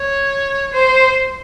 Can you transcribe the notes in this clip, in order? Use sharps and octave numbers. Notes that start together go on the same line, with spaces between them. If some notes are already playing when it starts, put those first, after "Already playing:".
Already playing: C#5
C5